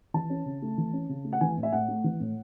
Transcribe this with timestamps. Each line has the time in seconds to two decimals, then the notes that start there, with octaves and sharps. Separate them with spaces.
0.14 E3 A5
0.30 C#4
0.46 C#3
0.62 A3
0.78 E3
0.93 C#4
1.09 C#3
1.25 A3
1.33 F#5
1.41 E3 G#5
1.57 A2
1.63 E5
1.72 A2 F#5
1.88 A3
2.04 E3
2.20 A2